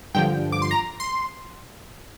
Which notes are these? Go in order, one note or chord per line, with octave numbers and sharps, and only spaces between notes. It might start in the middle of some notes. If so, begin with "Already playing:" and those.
G2 D3 F3 G5
D6
C6
A#5
C6